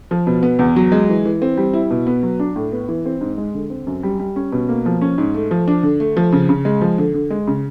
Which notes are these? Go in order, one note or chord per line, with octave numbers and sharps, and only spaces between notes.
F3
B2
B3
E2
F#3
G#3
E3
E3
C4
G3
E4
B2
B3
F#3
D4
A2
B3
E3
C4
G#2
G#3
D3
C4
F#2
G3
G3
C#4
B2
A#3
F3
C#4
G#2
A3
F3
D4
D3
A3
F3
C#3
C#3
G#3
F3
D3
D3
G#3
C#3